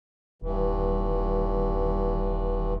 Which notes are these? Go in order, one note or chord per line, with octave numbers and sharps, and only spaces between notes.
D#1 G2 E3